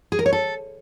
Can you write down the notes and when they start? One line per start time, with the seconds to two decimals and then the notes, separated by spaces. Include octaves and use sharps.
0.12 G#4
0.19 A#4
0.26 C#5
0.33 A4